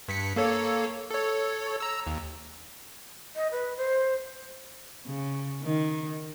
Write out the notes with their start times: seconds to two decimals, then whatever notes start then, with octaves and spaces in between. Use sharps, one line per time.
0.08 G2 B6 C#7
0.36 A#3 A4 C#5
1.11 A4 C#5
1.80 A#5 E6
2.07 D#2
3.36 D#5
3.52 B4
3.77 C5
5.06 C#3
5.62 D#3